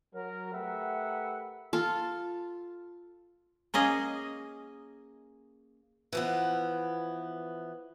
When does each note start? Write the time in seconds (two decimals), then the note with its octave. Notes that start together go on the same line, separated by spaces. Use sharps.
0.15 F#3 A#4
0.54 A3 G4 A#4 B4 E5 F#5
1.73 F4 A4 F5
3.74 A#3 C#4 G#4 D#5
6.13 E3 F3 B3